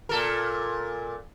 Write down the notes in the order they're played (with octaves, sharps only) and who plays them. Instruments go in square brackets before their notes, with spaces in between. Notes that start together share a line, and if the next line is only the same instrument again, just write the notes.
[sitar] A#2 A4 A#4